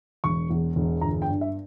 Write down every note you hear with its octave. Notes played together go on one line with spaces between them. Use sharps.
E1 C#6
E2
E1
G1 A#5
G5
G2
E5